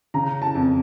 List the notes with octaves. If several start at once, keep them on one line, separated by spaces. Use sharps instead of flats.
C#3 A#5
A5
F2